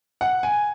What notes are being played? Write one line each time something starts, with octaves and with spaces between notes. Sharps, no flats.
F#5
G#5